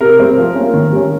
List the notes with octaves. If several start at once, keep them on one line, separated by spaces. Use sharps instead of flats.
C3 A#4
G3 C4
F3
A#3 C#4
D#3
G3 C#4